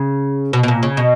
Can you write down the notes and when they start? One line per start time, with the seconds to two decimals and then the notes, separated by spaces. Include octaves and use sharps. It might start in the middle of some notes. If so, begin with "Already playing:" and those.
Already playing: C#3
0.53 B2
0.63 B2
0.68 A#2
0.83 C#3
0.97 B2